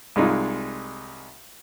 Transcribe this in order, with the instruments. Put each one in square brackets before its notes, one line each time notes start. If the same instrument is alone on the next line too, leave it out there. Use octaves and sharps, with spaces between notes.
[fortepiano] C2 G#3 D#4 F4